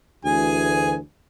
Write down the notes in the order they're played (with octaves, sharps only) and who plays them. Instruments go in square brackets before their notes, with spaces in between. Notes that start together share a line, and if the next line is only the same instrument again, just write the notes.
[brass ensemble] D2 E3 [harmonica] G#4 G#5